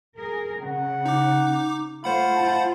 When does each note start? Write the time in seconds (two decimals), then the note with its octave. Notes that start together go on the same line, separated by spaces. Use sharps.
0.19 G#4 A#4
0.61 C#3 F#5
1.06 D#4 D6
2.04 A3 F4 C5 F#5 B5
2.36 E4 F4 A5